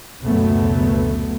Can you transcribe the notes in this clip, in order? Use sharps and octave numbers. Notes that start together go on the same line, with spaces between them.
F#1 D2 B2 F#3 A3 B3